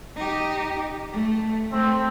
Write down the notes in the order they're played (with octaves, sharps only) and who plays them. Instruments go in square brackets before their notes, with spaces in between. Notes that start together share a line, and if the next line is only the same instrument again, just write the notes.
[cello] D#4 G4
A3
[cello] A3 [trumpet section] C4